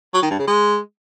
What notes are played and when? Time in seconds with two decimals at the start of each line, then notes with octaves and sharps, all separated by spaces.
0.14 F#3
0.22 D#3
0.30 G2
0.39 C#3
0.47 G#3